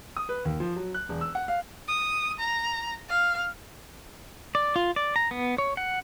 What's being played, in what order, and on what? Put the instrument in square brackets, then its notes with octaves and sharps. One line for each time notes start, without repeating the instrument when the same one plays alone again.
[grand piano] D#6
B4
D#2
F3
F#3
F#6
E1
E6
F#5
F5
[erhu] D#6
A#5
F5
[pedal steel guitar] D5
F4
D5
A#5
B3
C#5
F#5